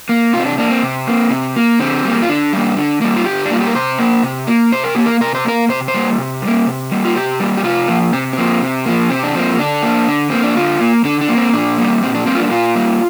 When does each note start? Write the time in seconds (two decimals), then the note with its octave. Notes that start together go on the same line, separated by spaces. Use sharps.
0.09 A#3
0.33 C3 F4
0.40 C4
0.45 D4
0.58 A#3 D4
0.70 C4
0.83 C3
1.07 A#3
1.31 C3
1.56 A#3
1.79 D3 C4
2.05 G3 A#3
2.22 F4
2.28 D3 D4
2.53 G3 A#3
2.77 D3
3.01 G3 A#3
3.17 F4
3.26 D3 G4
3.46 D4
3.51 G3 A#3 F4
3.60 G4
3.68 A#4
3.75 C3 C5
3.98 A#3
4.23 C3
4.47 A#3
4.72 C3 C5
4.84 A#4
4.95 A#3 G4
5.06 A#4
5.21 C3 A#4
5.34 C5
5.45 A#3 A#4
5.69 C3 C5
5.88 C5
5.94 G3 A#3
6.19 C3
6.42 G3 A#3
6.67 C3
6.91 G3 A#3
7.05 F4
7.15 C3 G4
7.40 G3 A#3
7.57 G4
7.63 C3 F4
7.88 F3 A#3
8.13 C3 C4
8.33 F3 A#3 C4
8.62 C3
8.86 F3 A#3
9.10 C3 C4
9.23 D4
9.35 F3 A#3 C4
9.59 D3 D4
9.83 A#3
10.08 D3
10.30 A#3 C4
10.44 D4
10.56 D3 F4
10.81 A#3
11.04 D3 D4
11.21 D4
11.29 A#3
11.37 C4
11.53 A#2 D4
11.78 G3 A#3
12.02 A#2 C4
12.14 D4
12.26 G3 A#3 C4
12.35 F4
12.39 D4
12.51 A#2 F4
12.75 G3 A#3